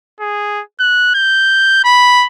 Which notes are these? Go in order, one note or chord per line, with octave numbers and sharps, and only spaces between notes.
G#4
F#6
G6
B5